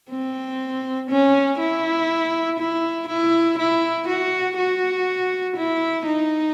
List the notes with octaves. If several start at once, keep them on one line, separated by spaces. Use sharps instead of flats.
C4
C#4
E4
E4
E4
E4
F#4
F#4
E4
D#4